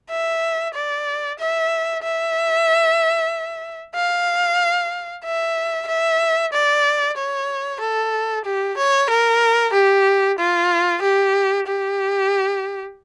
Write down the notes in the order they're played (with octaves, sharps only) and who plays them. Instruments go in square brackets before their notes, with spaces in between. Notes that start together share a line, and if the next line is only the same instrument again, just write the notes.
[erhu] E5
D5
E5
E5
F5
E5
E5
D5
C#5
A4
G4
C#5
A#4
G4
F4
G4
G4